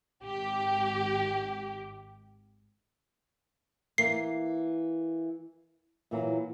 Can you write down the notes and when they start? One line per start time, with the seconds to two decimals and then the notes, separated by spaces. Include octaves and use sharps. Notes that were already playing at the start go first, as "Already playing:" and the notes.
0.21 G#1 G4
3.98 E3 A#3 C7
6.11 A#2 E3 F#3